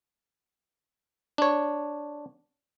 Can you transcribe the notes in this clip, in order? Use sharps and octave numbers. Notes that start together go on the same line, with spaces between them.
D4 C#5